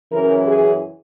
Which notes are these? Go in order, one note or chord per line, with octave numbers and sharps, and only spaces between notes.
F#2 C#3 E3 A#4
G#4